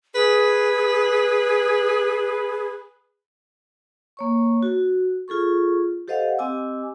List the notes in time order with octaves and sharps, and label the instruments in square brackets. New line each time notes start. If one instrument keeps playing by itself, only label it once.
[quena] G#4 [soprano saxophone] B4
[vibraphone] A#3 C#5 C#6
F#4
F4 G#4 A4 C#6
G4 A4 C5 D#5 F5 F#5
C4 G4 D#5 G#5 D6 E6